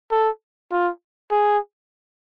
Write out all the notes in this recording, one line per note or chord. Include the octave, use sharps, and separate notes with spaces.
A4
F4
G#4